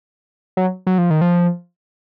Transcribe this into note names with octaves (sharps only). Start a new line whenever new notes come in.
F#3
F#3
F3
D#3
F3